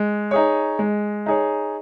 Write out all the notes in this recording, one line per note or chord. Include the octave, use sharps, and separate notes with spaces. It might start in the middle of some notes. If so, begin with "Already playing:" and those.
Already playing: G#3
D#4 G#4 C#5
G#3
D#4 G#4 C#5